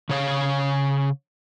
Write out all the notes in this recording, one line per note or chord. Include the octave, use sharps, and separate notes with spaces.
C#3 C#5 F5